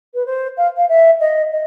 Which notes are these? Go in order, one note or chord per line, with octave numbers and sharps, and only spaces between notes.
B4
C5
F5
F5
E5
D#5
D#5